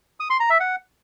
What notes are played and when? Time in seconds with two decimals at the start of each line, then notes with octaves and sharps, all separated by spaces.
0.20 D#6
0.30 C6
0.40 A#5
0.50 E5
0.60 F#5